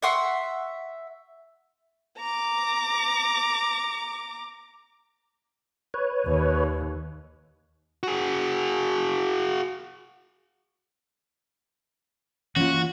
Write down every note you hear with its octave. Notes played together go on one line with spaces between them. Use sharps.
E5 F#5 C6 C#6
A#5 D6
B4 C#5
D#2
F#4 G#4
E3 A#3 C#4 F4 F#4